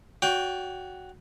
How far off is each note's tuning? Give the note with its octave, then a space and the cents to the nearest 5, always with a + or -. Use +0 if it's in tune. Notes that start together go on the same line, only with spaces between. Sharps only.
F#4 +0 C#5 +45 G5 +0